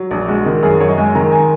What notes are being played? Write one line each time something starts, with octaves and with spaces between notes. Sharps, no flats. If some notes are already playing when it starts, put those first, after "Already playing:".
Already playing: F#3
A#1
G#3 F#4
D#3
F#2 G#4
F#2 C#5
D#5
G#3 G#5
D#3 A#5
G#5